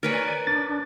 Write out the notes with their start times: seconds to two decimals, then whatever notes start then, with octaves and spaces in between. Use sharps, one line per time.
0.03 A#4 B4 C#5 D5 G#5
0.47 D4 A6